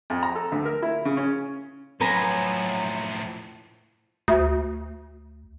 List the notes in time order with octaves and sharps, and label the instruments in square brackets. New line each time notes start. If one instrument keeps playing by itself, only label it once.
[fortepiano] F2
A#5
A4
D2
A#4
E4
C#3
C#4
[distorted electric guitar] A2 F3 [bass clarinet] F#3 [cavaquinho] B4 G#5 A#5
[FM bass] D2